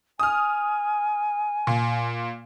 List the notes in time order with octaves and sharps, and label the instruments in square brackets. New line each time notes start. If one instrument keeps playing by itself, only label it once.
[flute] G#5 [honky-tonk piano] D#6 F6
[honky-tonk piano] A#2